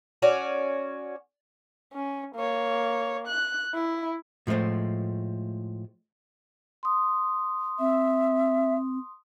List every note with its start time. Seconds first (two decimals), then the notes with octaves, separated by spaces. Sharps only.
0.22 C#4 F#4 D5
1.94 C#4
2.36 A#3 C#5
3.27 F#6
3.74 E4
4.47 A2 F3 G#3 A3 C5
6.83 C6 D#6
7.79 C4 E5